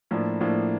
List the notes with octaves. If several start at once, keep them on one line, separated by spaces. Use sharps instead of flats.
A2 F3 A#3 D4
A2 F3 A#3 D4